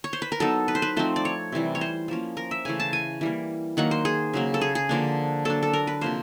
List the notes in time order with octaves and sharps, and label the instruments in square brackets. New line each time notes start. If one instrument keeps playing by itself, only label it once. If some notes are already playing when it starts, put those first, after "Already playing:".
[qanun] C#5
C5
B4
A#4
F#3 B3 D#4 A4
B4
C5
B4
F3 A3 C4 D#4 C5
D5
C#5
C3 E3 G3
C#5
C5
F3 A#3 C#4
A#4
E5
C#3 E3 A3 G#5
A5
G#5
E3 G3 A#3
D#3 F#3 A#3 F#5
C5
G#4
C#3 F#3 A#3
A4
G#4
G#4
D3 F3 A#3 D4
F#3 A#3 D4 A4
A4
A#4
B4
C3 F3 A#3 C5